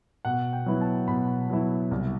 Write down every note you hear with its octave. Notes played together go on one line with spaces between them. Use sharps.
B2 F#5
G5
F#3 B3 E4
A5
B2 B5
F#3 B3 E4
C2